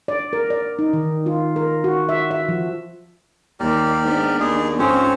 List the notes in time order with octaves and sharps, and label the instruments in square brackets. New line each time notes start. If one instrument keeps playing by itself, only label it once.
[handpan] D5
A#4
D5
D#4
D#3
F4
A#4
F#4
E5
E5
F3
[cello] D#2 [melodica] G4 A#4 D5
[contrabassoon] G#2 [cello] B3 D4
[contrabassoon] D#2 [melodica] D#4 G#4
[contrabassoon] F2 [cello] G#2 [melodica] C4 C5 C#5 [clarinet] C#4